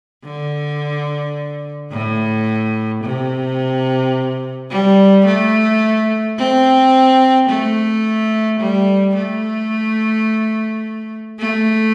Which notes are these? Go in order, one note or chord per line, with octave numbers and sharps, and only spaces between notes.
D3
A2
C3
G3
A3
C4
A3
G3
A3
A3